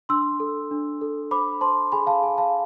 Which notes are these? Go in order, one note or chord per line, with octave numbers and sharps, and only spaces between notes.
D4 C6 E6
A4
D4
A4
C5 B5 D6
C5 A5 C6
G#4 G#5 B5
F5 A5
G#4 G#5
F5 A5